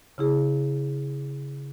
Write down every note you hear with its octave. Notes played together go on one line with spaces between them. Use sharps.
C#3 E4 G#4